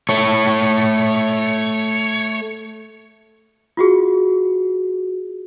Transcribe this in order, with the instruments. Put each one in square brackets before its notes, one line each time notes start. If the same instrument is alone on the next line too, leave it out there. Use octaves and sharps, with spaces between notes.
[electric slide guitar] A3 C#5
[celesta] F4 F#4 G#4